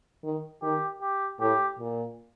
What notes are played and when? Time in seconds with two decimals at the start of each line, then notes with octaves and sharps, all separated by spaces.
0.23 D#3
0.62 D#3 G4
1.01 G4
1.40 A2 G4
1.79 A#2